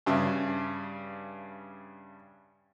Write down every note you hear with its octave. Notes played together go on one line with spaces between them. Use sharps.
G2 C#3 E5